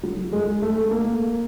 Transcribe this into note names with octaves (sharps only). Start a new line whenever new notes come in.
F#3
G#3
A3
A#3